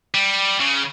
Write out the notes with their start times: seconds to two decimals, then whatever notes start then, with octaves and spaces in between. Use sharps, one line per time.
0.14 G3
0.61 C#3